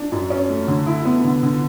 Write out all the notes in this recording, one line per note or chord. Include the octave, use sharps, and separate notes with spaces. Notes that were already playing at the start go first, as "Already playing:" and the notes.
Already playing: D4
F#2
C#4
A3
D3
E4
B3
D3
D3